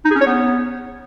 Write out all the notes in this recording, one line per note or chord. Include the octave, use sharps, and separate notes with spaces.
D#4
G#4
C#4
C#5
B3